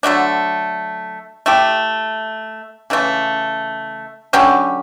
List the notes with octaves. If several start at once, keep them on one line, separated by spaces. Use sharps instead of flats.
D3 F#3 A3 D4
A3 E4 G4
C#3 E3 A3
D3 F#3 C#4 G4